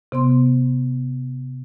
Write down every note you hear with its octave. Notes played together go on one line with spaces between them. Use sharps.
C3 B3 C6